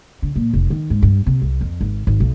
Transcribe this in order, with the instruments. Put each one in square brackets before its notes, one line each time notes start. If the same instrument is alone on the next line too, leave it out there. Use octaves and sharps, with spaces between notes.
[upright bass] D3
A#2
F1
D#3
G#2
G2
C3
C2
F2
G#1
G#1
B1